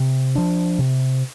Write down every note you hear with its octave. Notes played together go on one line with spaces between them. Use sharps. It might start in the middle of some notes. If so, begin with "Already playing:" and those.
Already playing: C3
F3 D4
C3